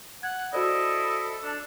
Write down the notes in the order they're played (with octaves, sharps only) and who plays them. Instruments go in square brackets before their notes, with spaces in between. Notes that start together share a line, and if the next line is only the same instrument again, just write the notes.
[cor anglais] F#5 [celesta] G#6
[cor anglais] E4 [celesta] F#4 C5 D5 [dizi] A4 [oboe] D#5
[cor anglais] D4